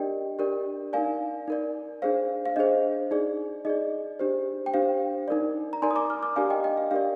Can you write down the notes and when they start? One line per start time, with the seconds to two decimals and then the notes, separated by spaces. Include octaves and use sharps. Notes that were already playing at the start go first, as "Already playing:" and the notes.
Already playing: D4 G4 A#4 D5 D#5 G5
0.39 D4 G4 A#4 D5
0.93 D#4 A#4 D5 F5 G#5
1.48 D#4 A#4 D5
2.02 D4 G#4 C5 F5
2.46 F5
2.56 D4 G#4 C5 D#5
3.11 D#4 G#4 D5
3.65 D#4 G#4 D5 D#5
4.19 D4 G4 C5
4.66 G5
4.74 D4 G4 C5 F5
5.28 D#4 A#4 D5
5.73 A#5
5.82 D#4 A#4 D5 G#5 C6
5.91 D#6
5.96 A#5 D6
6.10 D6 F6
6.23 D6 F6
6.36 D4 G4 A#4 D5 F5 G#5
6.50 D#5 G5
6.64 D#5 G5
6.77 F5
6.91 D4 G4 A#4 D5 F5